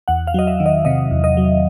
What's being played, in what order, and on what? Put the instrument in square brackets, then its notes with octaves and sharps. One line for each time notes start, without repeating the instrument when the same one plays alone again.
[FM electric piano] E2 F#5
F5
F#3 D#5
E5
D#3
D#5
C3 D#5
E2
D#5
F#3